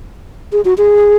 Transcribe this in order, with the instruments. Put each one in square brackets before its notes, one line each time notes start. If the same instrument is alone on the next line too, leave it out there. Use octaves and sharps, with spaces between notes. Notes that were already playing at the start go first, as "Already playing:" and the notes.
[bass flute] G#4
F#4
G#4